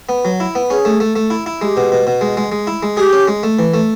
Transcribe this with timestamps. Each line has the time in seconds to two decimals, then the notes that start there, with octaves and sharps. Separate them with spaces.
0.09 B3
0.25 F#3
0.40 E4
0.55 B3
0.70 C#4 G#4
0.85 A3
1.00 A3
1.16 A3
1.30 E4
1.46 E4
1.61 G#3 G4
1.77 B2
1.92 B2
2.07 B2
2.21 G#3
2.37 G#3
2.52 G#3
2.67 E4
2.83 G#3
2.97 G4 G#4
3.12 C#4
3.28 G#3
3.43 A3
3.59 E3
3.74 A3